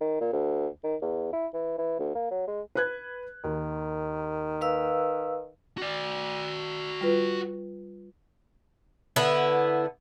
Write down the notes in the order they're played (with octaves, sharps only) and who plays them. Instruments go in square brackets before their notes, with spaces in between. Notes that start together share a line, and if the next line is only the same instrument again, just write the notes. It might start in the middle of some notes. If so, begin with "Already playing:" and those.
[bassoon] D#3
A#2
D2
D#3
E2
E4
E3
E3
D2
A#3
F#3
G#3
[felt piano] B4 F#6 G#6
[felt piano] D#2 [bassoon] D#3
[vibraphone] B4 F5 E6
[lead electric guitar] F#4 D5
[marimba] G3 F4 B4
[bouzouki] D3 B3 E4